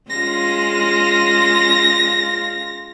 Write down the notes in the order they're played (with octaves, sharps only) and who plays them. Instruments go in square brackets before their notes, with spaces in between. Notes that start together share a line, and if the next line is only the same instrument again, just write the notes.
[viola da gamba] G#3 C#4 F4 [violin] A#6